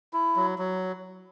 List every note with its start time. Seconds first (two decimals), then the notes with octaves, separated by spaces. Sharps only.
0.13 E4
0.36 F#3
0.59 F#3